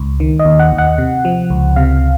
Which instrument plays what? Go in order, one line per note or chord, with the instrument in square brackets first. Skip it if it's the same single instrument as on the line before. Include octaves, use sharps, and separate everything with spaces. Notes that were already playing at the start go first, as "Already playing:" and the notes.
Already playing: [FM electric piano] C#2
D#3
D#5
D#2
F#5
D#2
F#5
C3
F3
C#2
C3 F5